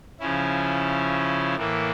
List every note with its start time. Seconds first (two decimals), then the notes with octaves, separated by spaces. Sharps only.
0.20 C#3 F3 C#4 E4
1.56 A2 E3 A#3 E4